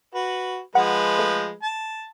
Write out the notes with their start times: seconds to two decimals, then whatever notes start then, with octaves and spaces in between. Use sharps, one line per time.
0.15 F#4 B4
0.75 F3 G#3 B4 F#5
1.19 A3
1.62 A5